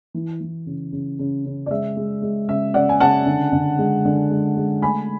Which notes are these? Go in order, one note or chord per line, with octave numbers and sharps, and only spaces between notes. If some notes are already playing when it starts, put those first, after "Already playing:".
E3
E3
C#3
C#3
C#3
C#3
D5
G#3 E5
G#3
G#3
C#3 E5
C#3 D5 F#5
G#5
C#3 F#5 A5
D3
D3
G#3
D3
G#3
G#3
A3 G#5 B5